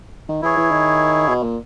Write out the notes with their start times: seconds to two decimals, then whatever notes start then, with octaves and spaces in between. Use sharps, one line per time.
0.29 D#3
0.42 E3 E4 G#4 C#5
0.57 E3
0.71 D#3
1.28 B2
1.43 A#2